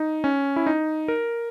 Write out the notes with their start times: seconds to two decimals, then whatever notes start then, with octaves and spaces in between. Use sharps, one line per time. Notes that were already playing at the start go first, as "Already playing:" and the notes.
Already playing: D#4
0.24 C#4
0.56 E4
0.66 D#4
1.08 A#4